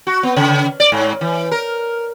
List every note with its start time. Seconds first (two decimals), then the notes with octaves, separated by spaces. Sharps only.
0.07 F#4
0.23 B3
0.36 C#3
0.80 D5
0.92 G#2
1.21 E3
1.51 A#4